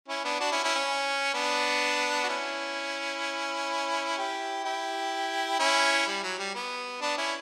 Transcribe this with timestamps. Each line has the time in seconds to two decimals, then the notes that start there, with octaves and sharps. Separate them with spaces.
0.08 C#4 E4
0.24 B3 D4
0.40 D4 F#4
0.51 C#4 E4
0.63 C#4 E4
0.75 C#4
1.34 B3 D4
2.24 F#4
2.29 C#4 E4
4.18 E4 G4
4.65 E4 G4
5.59 C#4 E4
6.06 G3
6.23 F#3
6.38 G3
6.55 B3
7.02 B3 D4
7.17 C#4 E4